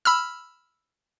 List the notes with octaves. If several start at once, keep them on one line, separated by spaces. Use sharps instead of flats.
B5 E6 F6